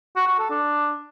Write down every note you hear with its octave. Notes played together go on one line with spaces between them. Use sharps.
F#4
F#4
A4
D4